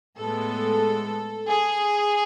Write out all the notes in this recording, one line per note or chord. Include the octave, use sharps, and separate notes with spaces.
A2 G#3 B3 A4
G#4